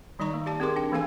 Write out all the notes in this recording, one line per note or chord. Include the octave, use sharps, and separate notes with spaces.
D#3 G3 D#4 D#5 A#5 C#6
A#3
G4 D5 A5
C4 G4 G#4 A#4 C6 D6
D4 G5
E3 A#3 C4 A4 F5 G#5